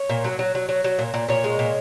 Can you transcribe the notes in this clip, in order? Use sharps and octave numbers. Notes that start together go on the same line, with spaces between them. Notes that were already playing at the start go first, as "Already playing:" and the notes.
Already playing: C#5
A#2
F#3
F#3
F#3
F#3
F#3
A#2
A#2
A#2 C#5
G#3
A#2